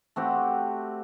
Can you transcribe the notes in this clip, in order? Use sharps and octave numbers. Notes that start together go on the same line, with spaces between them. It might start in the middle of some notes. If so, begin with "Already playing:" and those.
A3 C4 F#4 G4